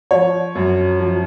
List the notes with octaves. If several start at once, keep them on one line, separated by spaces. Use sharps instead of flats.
F3 C#5
F#2
F3